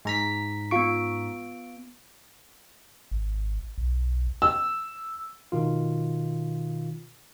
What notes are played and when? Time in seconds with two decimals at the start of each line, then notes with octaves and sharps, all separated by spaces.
0.05 G#2 A#5 B6
0.71 B3 F4 C#6 D7
3.11 G#1
3.78 B1
4.42 E6
5.52 B2 D#3 F4